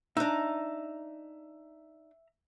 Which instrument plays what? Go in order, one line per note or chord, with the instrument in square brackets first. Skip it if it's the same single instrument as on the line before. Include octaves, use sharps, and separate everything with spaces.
[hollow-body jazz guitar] D4 D#4 [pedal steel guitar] E5 A#5